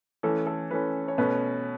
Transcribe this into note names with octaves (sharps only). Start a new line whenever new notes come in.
E3 A3 C#4 A4
A4
E3 A3 C#4 B4
C#5
B2 A3 C#4 B4